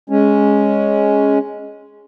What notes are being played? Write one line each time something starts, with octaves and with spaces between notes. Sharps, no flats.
G#3 C#4